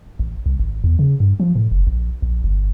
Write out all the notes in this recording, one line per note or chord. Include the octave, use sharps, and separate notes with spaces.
A1
C2
G#1
E2
C#3
G2
F3
A2
F#1
A#1
A#1
G1